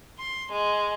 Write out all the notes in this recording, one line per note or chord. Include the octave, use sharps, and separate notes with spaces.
C6
G#3